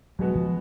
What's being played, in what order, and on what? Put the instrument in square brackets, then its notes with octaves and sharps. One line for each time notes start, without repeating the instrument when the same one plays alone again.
[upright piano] B2 G#3 B3 F#4 [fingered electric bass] F#3
[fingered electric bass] F3